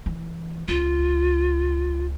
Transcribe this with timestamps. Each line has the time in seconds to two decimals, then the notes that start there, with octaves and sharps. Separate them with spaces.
0.06 E3
0.68 C#2 F4